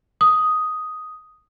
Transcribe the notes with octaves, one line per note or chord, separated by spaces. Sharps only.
D#6